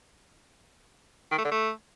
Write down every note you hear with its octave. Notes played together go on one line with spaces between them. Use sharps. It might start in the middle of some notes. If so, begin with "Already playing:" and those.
D#3
A3
D3
A3